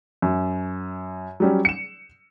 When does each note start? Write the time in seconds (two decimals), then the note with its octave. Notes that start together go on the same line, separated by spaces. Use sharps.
0.22 F#2
1.40 F#3 G3 C#4
1.65 C#7 E7